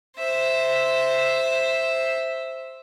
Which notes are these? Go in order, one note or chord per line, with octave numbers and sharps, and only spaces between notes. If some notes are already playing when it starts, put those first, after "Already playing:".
C5 E5